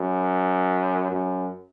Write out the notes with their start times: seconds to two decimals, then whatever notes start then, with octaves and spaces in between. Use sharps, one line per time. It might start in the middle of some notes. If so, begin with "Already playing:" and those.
Already playing: F#2
1.11 F#2